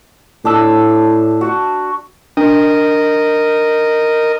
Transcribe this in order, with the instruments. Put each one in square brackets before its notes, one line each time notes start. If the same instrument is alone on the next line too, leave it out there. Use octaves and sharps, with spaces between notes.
[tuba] A2 [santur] D4 A5 E6
[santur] F#4
[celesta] D4 [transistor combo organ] A#4 D#5